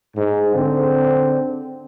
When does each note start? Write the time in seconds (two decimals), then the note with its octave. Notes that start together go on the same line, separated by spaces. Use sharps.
0.15 G#2
0.55 D3 C4